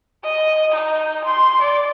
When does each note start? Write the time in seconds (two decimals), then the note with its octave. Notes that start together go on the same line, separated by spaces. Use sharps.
0.24 D#5
0.72 D#4
1.24 C6
1.61 D5